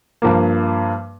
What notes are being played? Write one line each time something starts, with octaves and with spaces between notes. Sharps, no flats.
G2 F3 A#3